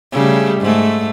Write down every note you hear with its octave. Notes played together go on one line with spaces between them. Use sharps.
C#3 G3 A3
G#2 A3